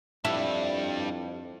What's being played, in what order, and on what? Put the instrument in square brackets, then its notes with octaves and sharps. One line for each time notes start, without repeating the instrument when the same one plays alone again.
[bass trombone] F2 [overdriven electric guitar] G3 D4 [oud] E4